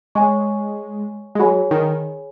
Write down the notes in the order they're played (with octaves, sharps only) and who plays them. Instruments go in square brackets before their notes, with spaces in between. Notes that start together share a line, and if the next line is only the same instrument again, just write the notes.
[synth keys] G#3 [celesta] C#5 G#5 C#6
[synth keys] G#3
[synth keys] F#3 [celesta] G#4 C#5 G#5 B5
[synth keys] D#3